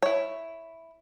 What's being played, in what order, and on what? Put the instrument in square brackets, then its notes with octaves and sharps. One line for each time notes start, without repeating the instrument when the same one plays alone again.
[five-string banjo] E4 C#5